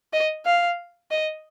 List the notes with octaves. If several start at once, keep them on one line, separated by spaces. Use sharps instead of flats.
D#5
F5
D#5